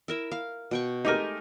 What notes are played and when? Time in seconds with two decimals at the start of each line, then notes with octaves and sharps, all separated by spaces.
0.08 E4 A#4 E5
0.32 F5
0.71 B2 G5 C#6
1.05 G#3 A3 D#4 G4 A#4 G#5